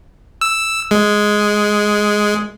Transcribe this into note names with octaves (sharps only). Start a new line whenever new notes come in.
E6
G#3